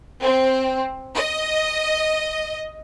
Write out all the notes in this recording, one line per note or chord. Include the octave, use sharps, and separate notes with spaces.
C4
D#5